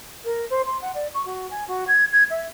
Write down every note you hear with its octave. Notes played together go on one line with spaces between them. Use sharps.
A#4
C5
C6
F#5
D5
C#6
F#4
G#5
F#4
G#6
G#6
E5